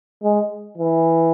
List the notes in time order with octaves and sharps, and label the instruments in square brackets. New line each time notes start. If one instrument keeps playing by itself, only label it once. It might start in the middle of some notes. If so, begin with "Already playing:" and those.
[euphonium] G#3
E3